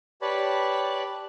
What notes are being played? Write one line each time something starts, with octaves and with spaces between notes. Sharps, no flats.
G4 B4 C#5 D5 A5 B5